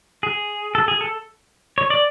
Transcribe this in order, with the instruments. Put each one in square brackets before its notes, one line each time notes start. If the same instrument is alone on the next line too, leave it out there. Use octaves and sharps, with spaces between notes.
[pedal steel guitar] G#4
A4
G#4
A4
C#5
D5